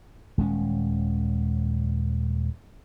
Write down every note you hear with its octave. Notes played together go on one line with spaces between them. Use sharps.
D#1 G#3 C#4